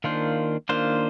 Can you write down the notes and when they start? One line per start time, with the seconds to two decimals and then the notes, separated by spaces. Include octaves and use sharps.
0.04 D#3 A#3 D4 F4 C5
0.69 D#3 A#3 D4 F4 C5